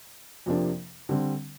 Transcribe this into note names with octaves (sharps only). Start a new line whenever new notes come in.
F2 C3 F3 A#3 D4
D3 G3 C4